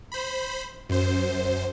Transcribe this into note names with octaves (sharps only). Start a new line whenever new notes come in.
C5 B5
F#2 C5